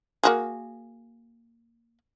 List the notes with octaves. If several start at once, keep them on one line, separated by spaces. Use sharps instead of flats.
A#3 F#4 G#4